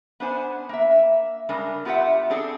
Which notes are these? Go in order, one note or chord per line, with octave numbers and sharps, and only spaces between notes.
B3 D4 C5 G#5
A#3 E5
G2 C#3 G#3 D4 A#4
B3 F4 G4 A#4 E5 F#5
C4 D4 G#4 A4